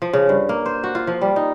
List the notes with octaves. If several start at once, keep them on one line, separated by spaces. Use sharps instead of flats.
F3
C#3
G2
A#3
C5
F#4
F4
F3
G3
D#4